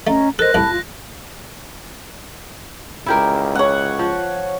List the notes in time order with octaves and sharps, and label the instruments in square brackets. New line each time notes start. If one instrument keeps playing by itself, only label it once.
[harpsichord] A3 [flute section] C#4 D#5 A#5
[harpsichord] A4 [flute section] A#4 C5 D#5 [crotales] F#6 A#6
[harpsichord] C2 A2 [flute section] A5 B5
[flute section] F4
[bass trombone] C#2 [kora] E4 G4 A#4
[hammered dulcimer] C#5 F#5
[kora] F3